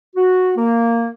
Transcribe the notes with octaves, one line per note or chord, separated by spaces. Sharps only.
F#4
A#3